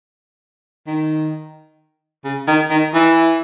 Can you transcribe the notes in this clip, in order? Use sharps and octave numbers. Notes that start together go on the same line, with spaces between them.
D#3
C#3
D#3
D#3
E3